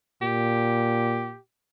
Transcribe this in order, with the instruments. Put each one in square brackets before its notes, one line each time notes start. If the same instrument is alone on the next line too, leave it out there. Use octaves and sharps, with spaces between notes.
[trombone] A#2 [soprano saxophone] G4